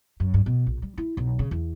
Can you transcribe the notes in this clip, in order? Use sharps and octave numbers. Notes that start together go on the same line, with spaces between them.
F#2
G2
B2
A#1
G3
E4
B1
C#3
E2